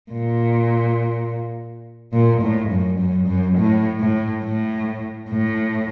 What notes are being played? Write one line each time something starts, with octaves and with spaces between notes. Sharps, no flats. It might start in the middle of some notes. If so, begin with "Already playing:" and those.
A#2
A#2
A2
F#2
F#2
F#2
A2
A2
A2
A2